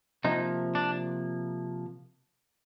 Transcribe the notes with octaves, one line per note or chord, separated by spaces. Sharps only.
C3 F3 A#3 D#4
D4